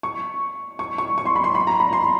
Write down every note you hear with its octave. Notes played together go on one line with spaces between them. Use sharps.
C#6
C#6
C#6
C#6
C6
B5
C6
B5
A#5
B5
C6